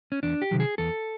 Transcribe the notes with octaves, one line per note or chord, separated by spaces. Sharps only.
C#4
E2 D4
G4
C3 D#3 F#3
G#4
E2 A4